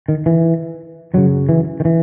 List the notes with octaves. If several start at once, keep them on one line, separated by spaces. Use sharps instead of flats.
D#3
E3
F#2 C#3 F#3
E3
D#3
E3